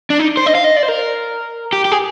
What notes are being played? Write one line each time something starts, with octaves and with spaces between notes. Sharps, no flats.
D4
D#4
C5
D#5
F5
D#5
D5
C5
A#4
G4
G4
G#4